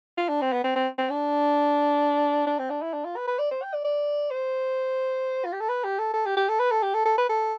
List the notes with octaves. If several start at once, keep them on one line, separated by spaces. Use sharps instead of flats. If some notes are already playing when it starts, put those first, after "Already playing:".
F4
D4
C4
B3
C4
C4
C4
D4
D4
C4
D4
E4
D4
F4
B4
B4
D5
C5
G5
D5
D5
C5
F4
G4
A4
B4
G4
A4
A4
G4
G4
A4
B4
A4
G4
A4
A4
B4
A4